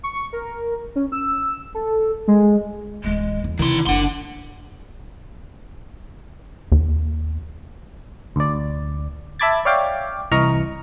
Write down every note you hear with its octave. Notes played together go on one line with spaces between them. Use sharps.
C#6
A#4
C#4
E6
A4
G#3
D1 E3 G#3
E2
C3 D#3 E3 E4 C6
F#1 D3 D4 F#5 C6
D#2
D2 D5
E5 A5 B5 D6 G#6 A6
C#5 D5 E5 F5 G5 D6
C2 E3 D#5 A#5 C#6 F6